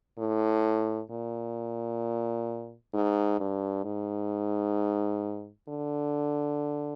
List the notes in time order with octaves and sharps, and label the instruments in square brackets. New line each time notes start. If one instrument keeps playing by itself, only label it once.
[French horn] A2
A#2
G#2
G2
G#2
D3